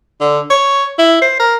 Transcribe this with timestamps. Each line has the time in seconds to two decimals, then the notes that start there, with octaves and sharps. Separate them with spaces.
0.21 D3
0.50 C#5
0.99 E4
1.22 C5
1.40 A#4